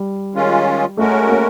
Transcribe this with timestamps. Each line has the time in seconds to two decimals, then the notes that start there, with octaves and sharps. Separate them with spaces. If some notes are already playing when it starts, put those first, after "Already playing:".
Already playing: G3
0.34 D#3 G#3 C#4 F4
0.97 G#3 A3 C#4 F#4 A#4
1.29 A#3